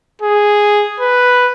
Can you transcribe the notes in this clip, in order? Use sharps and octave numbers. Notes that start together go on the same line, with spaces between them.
G#4
B4